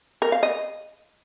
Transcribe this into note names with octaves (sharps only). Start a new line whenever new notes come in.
A#4
F5
D#5